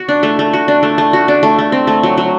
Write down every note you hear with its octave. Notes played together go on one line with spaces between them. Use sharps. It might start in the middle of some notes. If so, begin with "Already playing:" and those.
Already playing: F#4
D4
A3
A3
F#4
D4
A3
A3
F#4
D4
A3
A3
C4
A3
F#3
F#3